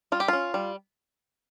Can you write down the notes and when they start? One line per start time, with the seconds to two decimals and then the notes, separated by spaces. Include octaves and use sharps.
0.12 G3 F4
0.20 G4
0.28 C#4 F4
0.54 G3